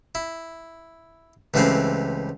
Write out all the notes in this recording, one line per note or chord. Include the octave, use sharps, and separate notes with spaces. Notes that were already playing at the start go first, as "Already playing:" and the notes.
E4
C#2 E3 G3 A3 C4 C#4